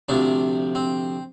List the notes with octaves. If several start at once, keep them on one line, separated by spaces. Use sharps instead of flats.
D2 C3 F3 D4
C4